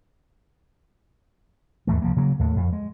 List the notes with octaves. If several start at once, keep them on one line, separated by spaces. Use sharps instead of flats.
D#2 G#2 E3 A3
C2 F3 A#3
C#3 F#3 A#3
D#2 A2
F2
G#3